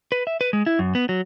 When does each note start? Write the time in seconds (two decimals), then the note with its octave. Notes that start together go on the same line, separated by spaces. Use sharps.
0.12 B4
0.27 E5
0.41 B4
0.53 G#3
0.66 E4
0.79 F#2
0.95 B3
1.09 F#3